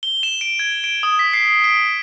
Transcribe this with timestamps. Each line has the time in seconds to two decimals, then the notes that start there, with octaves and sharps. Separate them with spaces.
0.03 G7
0.23 E7
0.41 D7
0.59 G#6
0.84 D7
1.03 D#6
1.19 B6
1.34 C7
1.64 D7